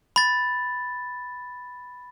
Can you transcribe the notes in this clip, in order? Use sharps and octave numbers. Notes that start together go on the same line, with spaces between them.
B5 A6